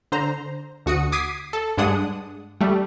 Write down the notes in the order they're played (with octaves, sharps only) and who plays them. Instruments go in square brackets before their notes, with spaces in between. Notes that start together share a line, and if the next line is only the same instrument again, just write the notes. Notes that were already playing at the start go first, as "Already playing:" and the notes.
[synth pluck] D3 C5 A#5
D2 F#4 D#6 C#7
D6 D#6 G#6 B6 C7 D#7
A4
G2 G#3 D4 F#5 D#6
G3 A3